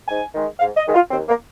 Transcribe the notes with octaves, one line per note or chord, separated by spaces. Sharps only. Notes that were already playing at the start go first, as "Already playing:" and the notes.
G#2 G#5
D#3 G#3
G#2 F5
D#5
D#3 G#3
F4
D#2 C4
A#3